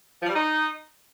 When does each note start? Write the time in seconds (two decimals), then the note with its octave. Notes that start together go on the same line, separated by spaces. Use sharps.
0.22 F3
0.28 G3
0.34 D#4